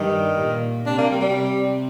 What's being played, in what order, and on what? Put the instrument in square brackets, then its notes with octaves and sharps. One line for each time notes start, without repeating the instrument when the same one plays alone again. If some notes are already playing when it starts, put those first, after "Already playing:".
Already playing: [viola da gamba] G2 G3 [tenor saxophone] D#3
[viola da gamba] A#2 A#3
[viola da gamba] C3 C4 [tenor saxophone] D4
[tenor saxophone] A#3
G3
G3
[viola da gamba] C3 C4